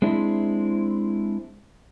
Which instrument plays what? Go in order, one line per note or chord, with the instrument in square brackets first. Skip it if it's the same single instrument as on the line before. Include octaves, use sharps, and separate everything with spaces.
[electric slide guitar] G#3 C4 D4 E4